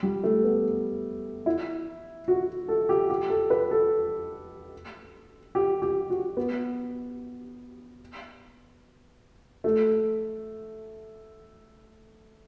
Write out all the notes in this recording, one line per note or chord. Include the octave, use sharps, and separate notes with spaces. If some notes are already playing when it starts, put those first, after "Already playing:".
G3
A3
B3
E4
F#4
A4
G4
G4
A4
B4
A4
G4
G4
F#4
B3
A3